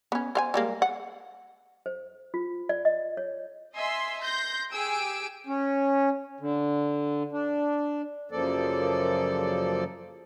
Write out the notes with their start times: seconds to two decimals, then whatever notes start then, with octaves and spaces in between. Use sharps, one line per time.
0.12 B3 C#4
0.35 C5 F5 G#5
0.54 G3 G#3 A#3
0.82 F#5
1.86 C5
2.34 F4
2.69 D5
2.85 D#5
3.17 C#5
3.73 D#5 E5 G#5 C6 E6
4.21 C6 G6 A#6
4.71 G4 G#4 G#5 E6 D7
5.47 C#4
6.40 D3
7.32 D4
8.31 F#2 C#3 F3 A#3 A4 D5